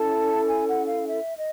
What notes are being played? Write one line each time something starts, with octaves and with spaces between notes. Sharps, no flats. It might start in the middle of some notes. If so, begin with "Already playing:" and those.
Already playing: C#4 E4 A4 A5
G#5
F#5
F5
E5
D#5